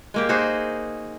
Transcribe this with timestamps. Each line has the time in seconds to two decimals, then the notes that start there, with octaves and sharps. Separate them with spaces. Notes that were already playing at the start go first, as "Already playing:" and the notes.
0.14 G#3 A#3 G4
0.29 D#4 F#4 G#4 C5